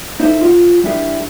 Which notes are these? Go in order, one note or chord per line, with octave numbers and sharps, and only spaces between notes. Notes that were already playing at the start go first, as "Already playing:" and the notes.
D#4 E4 A4 C5 D#5
F4 G#4 F#5
G3 D4 E4 G4 G#4 A#4